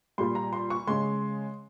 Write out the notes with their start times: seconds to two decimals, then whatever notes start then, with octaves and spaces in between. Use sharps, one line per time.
0.18 A#2 G3 C6
0.35 A#5
0.53 C6
0.70 C#6
0.87 C#3 G#3 C6